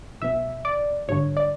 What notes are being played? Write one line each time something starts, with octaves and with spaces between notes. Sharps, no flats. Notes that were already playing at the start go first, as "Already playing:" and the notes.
B1 B2 E5
D5
G#1 G2 D3 C#5
D5